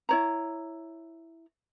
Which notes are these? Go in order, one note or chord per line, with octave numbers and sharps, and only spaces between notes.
E4 C#5 A#5